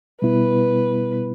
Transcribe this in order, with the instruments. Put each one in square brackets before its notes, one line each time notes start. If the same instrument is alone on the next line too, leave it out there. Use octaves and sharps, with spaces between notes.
[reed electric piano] B2 G3 B3 E4 [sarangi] B4